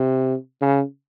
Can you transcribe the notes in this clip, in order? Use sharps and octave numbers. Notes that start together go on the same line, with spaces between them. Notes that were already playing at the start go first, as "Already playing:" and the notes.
Already playing: C3
C#3